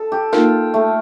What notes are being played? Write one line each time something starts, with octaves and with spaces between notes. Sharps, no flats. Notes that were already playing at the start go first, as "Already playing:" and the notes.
Already playing: A4
G4
A#3 D#4 F4 A#4
A3